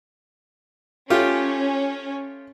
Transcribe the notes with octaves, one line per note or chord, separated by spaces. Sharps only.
A3 C#4 F4 G4